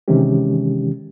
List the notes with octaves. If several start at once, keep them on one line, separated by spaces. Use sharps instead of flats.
C3 D#3 E3 G#3 C#4 G4